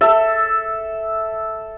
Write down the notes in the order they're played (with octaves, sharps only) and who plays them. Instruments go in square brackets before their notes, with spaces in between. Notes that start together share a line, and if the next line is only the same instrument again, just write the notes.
[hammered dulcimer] A4 E5